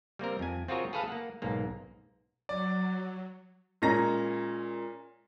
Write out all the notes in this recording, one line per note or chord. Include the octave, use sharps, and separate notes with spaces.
G3 A#3 C4 A#4
F2 G#5
C4 F4 F#4 G#4 A#4 C#5
G#4 A4 B4 F5 A5
A#3 F#5
B1 G#2 A#3
F#3 D5
A#2 G#3 C#4 A#5 A#6